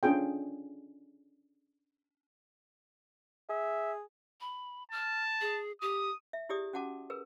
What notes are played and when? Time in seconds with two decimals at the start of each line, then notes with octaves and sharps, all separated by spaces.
0.03 C#4 D4 F4 G#4 G5
3.49 G#4 E5
4.41 B5
4.92 A5 F6
5.41 G#4
5.81 G4 D#6
6.33 E5
6.49 E4 G4 G#4 D5 D#6
6.73 C#4 F#4 F#5 A5 D6
7.10 G#4 A#4 B4